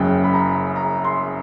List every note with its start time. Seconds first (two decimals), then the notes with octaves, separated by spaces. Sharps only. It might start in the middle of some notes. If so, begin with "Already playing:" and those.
Already playing: F#1 F#2 C#3 G5
0.24 B5
0.33 A#5
0.76 A#5
1.04 C6